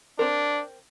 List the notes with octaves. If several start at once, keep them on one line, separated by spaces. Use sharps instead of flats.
C4 D4 A#4